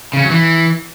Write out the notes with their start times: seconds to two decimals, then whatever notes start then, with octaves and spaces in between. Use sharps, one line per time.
0.13 C#3
0.19 C#4
0.25 F#3
0.30 E3